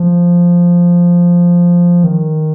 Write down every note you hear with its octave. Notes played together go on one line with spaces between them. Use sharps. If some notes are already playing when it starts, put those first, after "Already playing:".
Already playing: F3
D#3